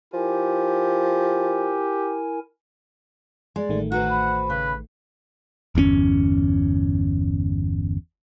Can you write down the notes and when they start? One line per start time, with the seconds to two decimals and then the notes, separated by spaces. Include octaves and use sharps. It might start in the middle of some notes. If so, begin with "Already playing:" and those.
0.13 F3 E4 G4 A#4 G#5
3.56 G#3 D5
3.69 A1 D#3 A3
3.92 F#4 B4 C5 F#5 A#5
4.09 B5
4.50 C#3 B4
5.75 G1 E2 C4 C#4